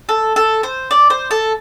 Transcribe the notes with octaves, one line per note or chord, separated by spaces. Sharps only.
A4
A4
C5
D5
C5
A4